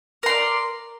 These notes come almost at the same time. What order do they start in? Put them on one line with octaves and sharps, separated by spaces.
A#4 C6 D5